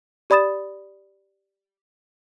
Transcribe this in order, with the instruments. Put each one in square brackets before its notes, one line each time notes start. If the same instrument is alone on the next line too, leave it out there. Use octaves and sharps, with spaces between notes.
[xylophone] G4 D5 B5 D#6 A6 E7